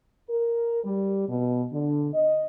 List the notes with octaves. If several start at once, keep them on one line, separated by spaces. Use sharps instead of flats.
A#4
G3
B2
D3
D#5